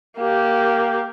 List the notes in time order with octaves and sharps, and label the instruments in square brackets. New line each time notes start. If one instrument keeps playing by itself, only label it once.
[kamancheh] A#3 G4